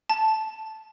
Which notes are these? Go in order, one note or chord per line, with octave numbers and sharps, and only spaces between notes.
A5